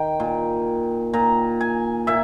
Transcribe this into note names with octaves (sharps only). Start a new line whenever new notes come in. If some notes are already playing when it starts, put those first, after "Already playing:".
Already playing: D#3 G5
A#2
A#2 A#5
G#5
A#2 E5